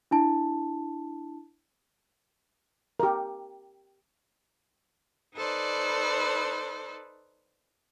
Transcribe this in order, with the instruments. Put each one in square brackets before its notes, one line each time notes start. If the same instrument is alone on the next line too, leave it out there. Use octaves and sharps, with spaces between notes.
[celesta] D4 E4 A5
[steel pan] G4 A#4
[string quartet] D#4 A4 B4 C5 D5